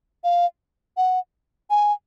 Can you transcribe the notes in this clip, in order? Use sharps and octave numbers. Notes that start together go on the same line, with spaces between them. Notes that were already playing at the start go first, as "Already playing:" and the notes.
F5
F#5
G#5